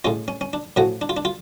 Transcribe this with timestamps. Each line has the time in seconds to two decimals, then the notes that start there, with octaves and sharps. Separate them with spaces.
0.04 A2 G#3 C#4 F4
0.28 C#4
0.41 C#4
0.53 D4
0.76 A2 F3 A3 C#4 F#4
1.01 D4
1.09 F4
1.17 D4
1.25 F4